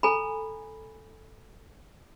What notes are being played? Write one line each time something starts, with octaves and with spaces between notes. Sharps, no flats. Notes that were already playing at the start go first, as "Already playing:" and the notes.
A4 G#5 A#5 B5